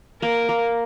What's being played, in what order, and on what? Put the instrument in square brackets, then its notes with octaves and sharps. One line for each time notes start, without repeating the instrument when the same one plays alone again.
[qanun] A#3 [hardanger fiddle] A#4
[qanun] A#3